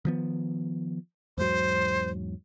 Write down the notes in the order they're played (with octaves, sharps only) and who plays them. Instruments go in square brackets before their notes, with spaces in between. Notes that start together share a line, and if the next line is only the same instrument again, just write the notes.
[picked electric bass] D#3 F3 B3
[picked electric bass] E2 G#2 F#3 [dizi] C5